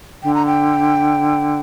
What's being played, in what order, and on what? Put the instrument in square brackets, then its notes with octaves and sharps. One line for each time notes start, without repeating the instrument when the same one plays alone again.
[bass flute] D3 [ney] G5
[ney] A#5
G5